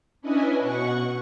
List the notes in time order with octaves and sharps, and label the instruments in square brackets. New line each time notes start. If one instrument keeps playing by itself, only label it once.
[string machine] C#4 D4 E4 B4 D#5 G#5
B2 F#5 C#6